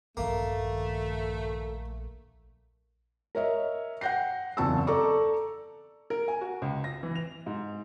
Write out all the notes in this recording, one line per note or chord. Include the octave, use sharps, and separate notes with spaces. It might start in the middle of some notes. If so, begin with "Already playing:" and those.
A#1 G2 D#3 A3 A#3
A#4 C#5 D#5 E5
F#5 G5 G6 A#6 C7
F#1 E2 C4 A5 C#6 E6
A4 D5 A#5 C#6 D6
A#4
G#5
F#4
C#2
A#6
E3
F7
G#2